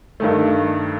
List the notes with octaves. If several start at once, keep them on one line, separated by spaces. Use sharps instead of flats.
G2 D#3 A3